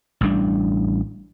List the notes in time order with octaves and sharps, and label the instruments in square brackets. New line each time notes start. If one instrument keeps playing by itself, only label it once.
[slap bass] A1 G3 D4